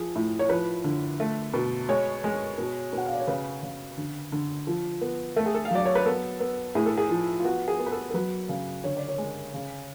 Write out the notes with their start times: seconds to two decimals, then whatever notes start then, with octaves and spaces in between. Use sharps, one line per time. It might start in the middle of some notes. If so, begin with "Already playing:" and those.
Already playing: F3 G#4
0.16 A2
0.39 C#5
0.49 F3 B4
0.84 D3
1.20 A3
1.54 B2
1.89 G#3 C#5
2.24 G#3
2.58 B2
2.93 B2 F#5
3.05 F5
3.13 D5
3.20 C#5
3.27 C#3 B4
3.63 C#3
3.97 D3
4.32 D3
4.67 F3
5.01 B3
5.36 A3 A4
5.46 G#4
5.54 A4
5.65 F5
5.71 F#3 D5
5.86 C#5
5.95 B4
6.06 B3 A4
6.40 B3
6.75 A2 G#4
6.86 A4
6.98 G#4
7.10 F3
7.40 F4
7.44 B3 F#4
7.68 G#4
7.79 B3
7.86 B4
7.92 A4
8.10 A4
8.14 F#3 B4
8.49 C#3
8.84 D3 C#5
8.97 D5
9.09 C#5
9.18 G#3
9.54 C#3